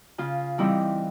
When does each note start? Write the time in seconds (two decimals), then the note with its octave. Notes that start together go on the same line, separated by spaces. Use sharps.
0.18 C#3 F4
0.58 E3 G3 C4 D#4 E4